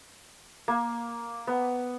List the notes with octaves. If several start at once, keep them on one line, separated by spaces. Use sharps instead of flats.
A#3
B3